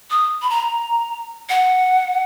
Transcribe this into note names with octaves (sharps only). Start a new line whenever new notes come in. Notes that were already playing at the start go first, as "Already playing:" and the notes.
D#6
B5
A#5
F#5